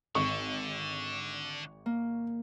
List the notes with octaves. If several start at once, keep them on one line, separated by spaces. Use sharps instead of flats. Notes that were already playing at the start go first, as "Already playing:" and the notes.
G#1 D3 C#6
A#3